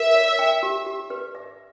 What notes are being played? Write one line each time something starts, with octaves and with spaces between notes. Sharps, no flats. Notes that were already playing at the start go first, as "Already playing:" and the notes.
Already playing: A#4 E5
C#5
G5
G4
G4
B4
E5